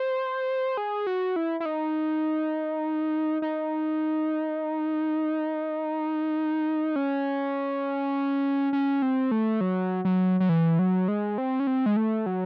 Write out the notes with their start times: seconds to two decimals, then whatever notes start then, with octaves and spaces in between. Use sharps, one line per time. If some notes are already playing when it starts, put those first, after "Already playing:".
Already playing: C5
0.77 G#4
1.07 F#4
1.36 E4
1.60 E4
1.66 D#4
3.42 D#4
6.96 C#4
8.73 C#4
9.02 C4
9.31 A3
9.61 F#3
10.05 F#3
10.40 F#3
10.49 E3
10.79 F#3
11.08 G#3
11.38 C4
11.60 C#4
11.67 C4
11.86 G#3
11.97 A3
12.26 F#3